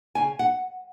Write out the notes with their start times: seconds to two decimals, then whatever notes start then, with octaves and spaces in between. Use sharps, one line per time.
0.15 C#3 G#5
0.39 F#5